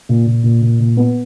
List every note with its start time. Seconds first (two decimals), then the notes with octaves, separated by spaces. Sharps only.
0.09 A#2
0.26 A#2
0.43 A#2
0.62 A#2
0.80 A#2
0.97 B3